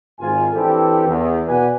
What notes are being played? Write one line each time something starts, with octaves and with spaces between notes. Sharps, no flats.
G#1 G#2 F4 G#5
E3 C4 D4 E4 G4 A4
E2
B2 B4 D5 F#5 G#5